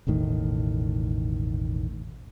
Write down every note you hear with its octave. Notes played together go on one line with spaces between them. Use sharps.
E1 A1 A2 D#3